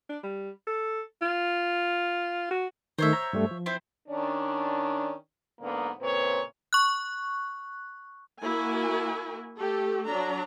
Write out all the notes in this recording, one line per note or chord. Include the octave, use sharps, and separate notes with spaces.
D4
G3
A4
F4
F#4
D#3 A3 C5 C#5 E5
A#5
G2 G3 A3
F3
C4 E4 C5
D#3 C#4 D4
G#2 D3 A#3 B3
A#2 C#3 C4 B4 C#5
C#6 F#6
A#3 E4 F#4 A#4 G#5
A3 G4 A4
F#3 D4 A#5